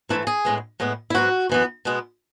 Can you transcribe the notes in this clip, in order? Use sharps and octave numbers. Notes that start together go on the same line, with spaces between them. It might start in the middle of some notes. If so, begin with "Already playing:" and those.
G#2 E3 A3 E4
G#4
A2 G#3 B3
A2 G#3 B3
E4
G#2 F#3 B3 F#4
F#2 E3 B3
B2 G#3 B3